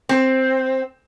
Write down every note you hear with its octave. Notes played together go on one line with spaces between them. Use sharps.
C4